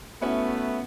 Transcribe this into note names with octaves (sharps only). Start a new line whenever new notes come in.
A3 B3 C#4 E4 F#4